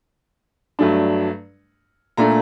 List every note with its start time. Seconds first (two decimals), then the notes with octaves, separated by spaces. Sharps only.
0.79 G2 F#3 A3 D4
2.17 A#2 A3 D4 A#5